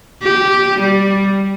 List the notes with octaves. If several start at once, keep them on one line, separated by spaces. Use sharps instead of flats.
G4
G3